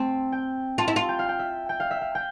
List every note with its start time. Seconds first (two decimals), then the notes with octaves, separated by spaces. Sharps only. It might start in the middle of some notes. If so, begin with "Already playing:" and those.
Already playing: C4 A5
0.32 G5
0.78 F4 A5
0.88 E4
0.96 F4
1.09 G5
1.19 F5
1.29 G5
1.39 E5
1.69 G5
1.80 F5
1.91 E5
2.01 F5
2.15 G5